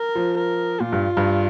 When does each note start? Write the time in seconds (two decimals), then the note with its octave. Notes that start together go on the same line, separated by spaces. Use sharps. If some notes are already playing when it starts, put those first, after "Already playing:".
Already playing: A#4
0.15 F3
0.37 A#4
0.80 A#2 F4
0.92 G2
1.17 G2